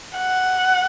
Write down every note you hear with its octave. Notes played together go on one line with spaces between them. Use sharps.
F#5